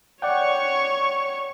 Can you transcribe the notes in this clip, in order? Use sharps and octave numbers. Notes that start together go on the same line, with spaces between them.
C#5 D5 F#5 G5 C#6